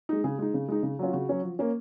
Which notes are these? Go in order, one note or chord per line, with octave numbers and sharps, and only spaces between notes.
G#3 D#4
C#3 G#4
G#3 D#4
C#3
G#3 D#4
C#3
F#3 C#4 F4
C#3 F#4
F#3 C#4
F3
A#3 C#4